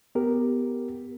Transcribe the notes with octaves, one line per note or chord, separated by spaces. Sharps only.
B3 G4 A#4